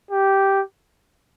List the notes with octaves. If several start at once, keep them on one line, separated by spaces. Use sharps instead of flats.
G4